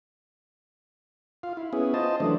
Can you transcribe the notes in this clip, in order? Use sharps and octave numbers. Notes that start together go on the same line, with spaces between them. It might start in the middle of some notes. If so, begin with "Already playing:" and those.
F4 F5
E4
B3 C#4 E4 G#4
F4 C5 D#5 A5
E3 F#3 A3 D4